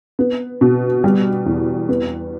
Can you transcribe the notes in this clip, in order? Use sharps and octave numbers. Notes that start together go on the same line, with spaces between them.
B3
B2
G3
E2
B3